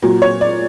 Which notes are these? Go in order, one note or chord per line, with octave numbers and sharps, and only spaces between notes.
A#2 F#3
C#5
D5